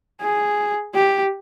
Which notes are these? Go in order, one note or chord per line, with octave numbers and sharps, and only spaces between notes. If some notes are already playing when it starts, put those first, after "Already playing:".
G#4
G4